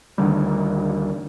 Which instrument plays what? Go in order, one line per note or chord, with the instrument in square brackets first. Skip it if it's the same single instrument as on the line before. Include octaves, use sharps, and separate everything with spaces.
[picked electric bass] D2 D3 D#3 G3